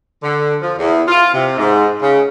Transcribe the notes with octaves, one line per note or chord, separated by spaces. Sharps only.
D3
F3
E2
F4
C3
G#2
C#3